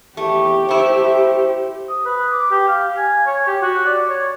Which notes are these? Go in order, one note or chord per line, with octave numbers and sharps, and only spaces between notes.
E2 A3 G4
A3 E4 C5
D#6
B4
D6
G4
F5
G#5
C#5
G4
F#4
D5
C#5